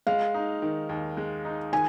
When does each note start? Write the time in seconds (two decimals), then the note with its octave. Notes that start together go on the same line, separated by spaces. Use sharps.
0.07 G#3 F5
0.34 D#4
0.62 D#3
0.89 D#2
1.17 G#3
1.45 D#4
1.72 D#3 G#5